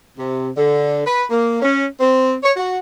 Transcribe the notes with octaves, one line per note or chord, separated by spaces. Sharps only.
C3
D3
B4
A#3
C#4
C4
C#5
F#4